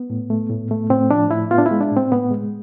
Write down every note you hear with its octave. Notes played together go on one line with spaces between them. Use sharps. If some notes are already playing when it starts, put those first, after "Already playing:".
Already playing: B3
A2
A3
A2
A3
A2 C4
F3 D4
A2 E4
B3 F4
D4
E4
G#3
D4
A2
C4
A2 B3
G#3